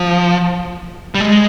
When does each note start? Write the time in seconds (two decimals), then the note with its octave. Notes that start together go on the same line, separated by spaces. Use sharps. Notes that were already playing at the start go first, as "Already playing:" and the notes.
Already playing: F3
1.15 G3
1.20 G#3